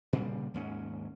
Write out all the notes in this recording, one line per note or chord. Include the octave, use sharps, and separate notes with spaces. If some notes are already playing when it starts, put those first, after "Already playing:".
A#2 C#3 G3
D#2 G#2 C#4